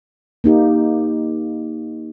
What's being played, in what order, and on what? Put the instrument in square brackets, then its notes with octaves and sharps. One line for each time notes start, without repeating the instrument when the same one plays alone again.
[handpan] A#3 D#4 G4